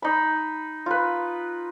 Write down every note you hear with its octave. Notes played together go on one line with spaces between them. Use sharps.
D#4 B5
F4 B4